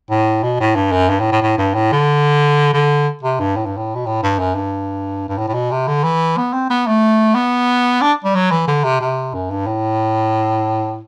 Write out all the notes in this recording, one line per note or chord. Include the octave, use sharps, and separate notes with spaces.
A2
B2
A2
G2
F#2
G2
A2
A2
A2
G2
A2
D3
D3
C3
G2
A2
G2
A2
B2
A2
G2
F#2
G2
G2
A2
A2
B2
C3
D3
E3
B3
C4
B3
A3
B3
D4
G3
F#3
E3
D3
C3
C3
F#2
G2
A2